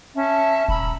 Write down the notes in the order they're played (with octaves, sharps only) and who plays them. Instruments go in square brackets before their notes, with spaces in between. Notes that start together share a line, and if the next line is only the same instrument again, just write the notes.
[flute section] C#4 E5 A5
[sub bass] D#1 [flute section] A#5 B5 E6